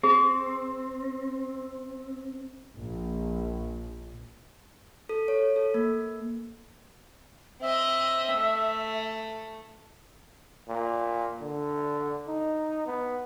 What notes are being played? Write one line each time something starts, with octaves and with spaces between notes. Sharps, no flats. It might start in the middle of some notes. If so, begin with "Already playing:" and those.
C4 G#4
A#1
A4
C#5
A4
A#3
C4 D#5 E5
A3
A#2
D3
D#4
B3